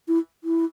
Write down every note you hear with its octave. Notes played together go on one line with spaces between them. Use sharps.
E4
E4